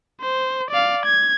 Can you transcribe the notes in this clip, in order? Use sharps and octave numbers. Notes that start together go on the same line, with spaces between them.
C5
D5 F5
G#6